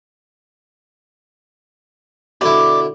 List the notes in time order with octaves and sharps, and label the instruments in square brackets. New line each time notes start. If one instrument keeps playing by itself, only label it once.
[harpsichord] B2 D3 E4 [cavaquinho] D5